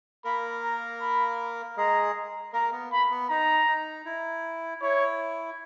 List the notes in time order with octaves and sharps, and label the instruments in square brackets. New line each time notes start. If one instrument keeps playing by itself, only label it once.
[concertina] A#3 A#4 [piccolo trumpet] B5
[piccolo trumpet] A#5
B5
[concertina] G#3 G#4 [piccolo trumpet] A#5
[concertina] A#3 A#4 [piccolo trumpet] A#5
[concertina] B3
[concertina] A#3 [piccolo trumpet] B5
[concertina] B3
[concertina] D#4 [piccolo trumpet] A#5
[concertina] D#4
E4
[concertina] E4 [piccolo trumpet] C#5